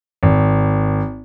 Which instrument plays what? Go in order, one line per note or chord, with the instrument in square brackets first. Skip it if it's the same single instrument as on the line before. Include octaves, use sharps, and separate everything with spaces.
[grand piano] G#1